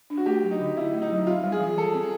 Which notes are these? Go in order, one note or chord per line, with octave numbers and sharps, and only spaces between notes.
D4
F#4
A3 G4
F#3
D#4
D3
C4 E4
A3
D#4
F#3
C4 F4
G3
G#4
E3
E3 A4
C4